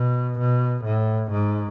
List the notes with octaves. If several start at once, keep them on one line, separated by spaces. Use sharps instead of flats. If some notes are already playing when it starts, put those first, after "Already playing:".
Already playing: B2
B2
A2
G#2